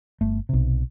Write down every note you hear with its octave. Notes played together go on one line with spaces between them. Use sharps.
G1 A3
B1 C3